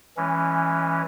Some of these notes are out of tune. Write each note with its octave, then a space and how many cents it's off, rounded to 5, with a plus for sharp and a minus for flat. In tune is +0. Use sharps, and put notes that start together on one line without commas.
E3 +0 G#3 -25 C#4 +0